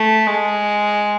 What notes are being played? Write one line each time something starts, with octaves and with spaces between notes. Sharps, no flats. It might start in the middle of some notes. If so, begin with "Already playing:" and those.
Already playing: A3
G#3